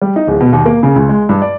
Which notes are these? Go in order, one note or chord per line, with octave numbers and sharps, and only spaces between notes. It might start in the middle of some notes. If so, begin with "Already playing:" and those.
G3
D#4
D1
B2
D#2
A#3
C#3
C#2
G#3
G2
D5